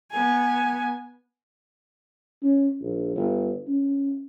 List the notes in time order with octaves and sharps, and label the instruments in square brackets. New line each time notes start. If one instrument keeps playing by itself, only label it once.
[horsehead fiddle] B3 G#5
[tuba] C#4
A#1
G1
C#4